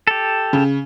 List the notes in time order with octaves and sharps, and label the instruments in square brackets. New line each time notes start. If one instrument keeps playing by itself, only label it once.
[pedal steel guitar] G4 A4
[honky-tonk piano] C#3